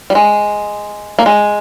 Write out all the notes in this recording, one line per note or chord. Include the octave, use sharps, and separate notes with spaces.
G3
G#3
A#3
G#3